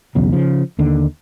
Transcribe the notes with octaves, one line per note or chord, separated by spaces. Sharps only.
B1 E2 C#3 F#3
C#3 F3
D#2 D3 D#3